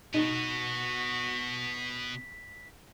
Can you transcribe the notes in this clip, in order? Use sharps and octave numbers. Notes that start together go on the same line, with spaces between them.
B2 B3 D#4 F#4 B6